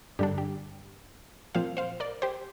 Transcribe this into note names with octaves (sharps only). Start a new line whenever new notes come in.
G2 D3 G3 D4 G4
G4
A#2 F3 C4 C5 F5
C5 F5
A#4 D5
G4 C5